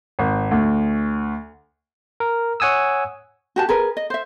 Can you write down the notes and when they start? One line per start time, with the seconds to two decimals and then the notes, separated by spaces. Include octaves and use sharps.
0.19 G#1
0.51 D2
2.20 A#4
2.60 C#5 F#5 G#5 D#6 E6
3.56 F#4 G4 A5
3.69 G#4 A#4 B4
3.97 D#5
4.10 C5 E5